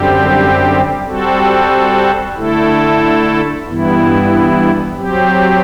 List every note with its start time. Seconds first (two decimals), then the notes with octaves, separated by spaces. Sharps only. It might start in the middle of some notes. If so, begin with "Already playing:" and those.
Already playing: F#2 D3 G3 C4 G4
1.07 G3 C4 F#4 A4
2.37 D3 A3 E4 A4
3.67 G2 E3 B3 E4
4.97 F#3 C4 G4